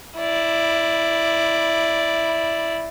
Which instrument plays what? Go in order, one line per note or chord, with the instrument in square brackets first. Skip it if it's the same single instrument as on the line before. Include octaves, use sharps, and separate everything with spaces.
[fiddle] E4 D5